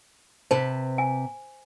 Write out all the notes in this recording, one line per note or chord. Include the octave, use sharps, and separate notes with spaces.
C3 B4 C5 A5
G#5